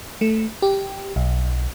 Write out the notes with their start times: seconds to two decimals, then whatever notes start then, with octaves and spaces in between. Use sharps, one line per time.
0.21 A3
0.62 G4
1.16 B1